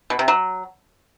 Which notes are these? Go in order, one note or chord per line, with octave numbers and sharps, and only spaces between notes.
B2
C3
F#3